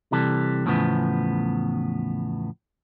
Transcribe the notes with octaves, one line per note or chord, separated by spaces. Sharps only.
C3 E3 G3 A4
E2 A2 C#3 F3 B3